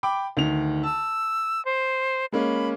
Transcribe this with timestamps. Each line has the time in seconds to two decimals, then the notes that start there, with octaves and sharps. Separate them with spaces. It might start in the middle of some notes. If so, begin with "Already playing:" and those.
0.03 G5 B5 D6
0.37 D2 D#3 F7
0.83 A5 E6
1.65 C5
2.32 G#3 A#3 C#4 B5